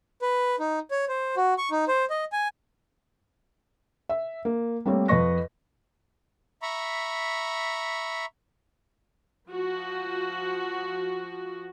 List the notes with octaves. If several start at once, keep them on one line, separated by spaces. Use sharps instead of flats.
B4
D#4
C#5
C5
F#4
C#6
D#4
C5
D#5
G#5
E5
A#3
G3 A3 A#3 C4 A#4 C#5
F2 B4 D#5 C#6 A#6
E5 A#5 B5 C#6
F3 F#4